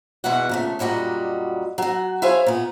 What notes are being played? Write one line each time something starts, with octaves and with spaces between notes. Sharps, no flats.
E2 B2 E3 G#3 F#4 F#5
A#2 C#3 A3
F#2 A#2 G3 F#4 D#5
F#3 F#4
E4 G#4 C5 C#5 F5 G#5
A#2 B3